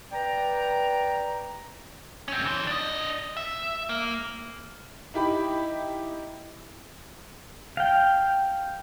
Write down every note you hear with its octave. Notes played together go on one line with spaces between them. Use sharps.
B4 D5 G5 A#5
C4 C#4
E3 C5
D4 D#5
E5
A#3
D#4 E4 G4 B5
F5 G5